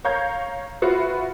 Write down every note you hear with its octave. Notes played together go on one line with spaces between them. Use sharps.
C#5 F5 A#5 C#6 G6 G#6
F4 F#4 B4 E5